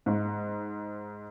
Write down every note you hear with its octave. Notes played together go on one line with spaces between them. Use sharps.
G#2